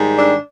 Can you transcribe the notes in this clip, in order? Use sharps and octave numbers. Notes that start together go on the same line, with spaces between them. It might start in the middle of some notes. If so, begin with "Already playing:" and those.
Already playing: G#2 D#3 G3
D4